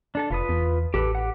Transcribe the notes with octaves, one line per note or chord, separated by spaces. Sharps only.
D4 A4 A5
F1 F4 B4 D#6
E2
A1 G4 A4 B4
G4 F#5